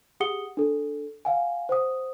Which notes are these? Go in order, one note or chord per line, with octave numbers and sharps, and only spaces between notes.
G4 G#4 F#5 D#6 C#7 G7
D4 A4
F5 F#5 G#5
C5 F#5 D#6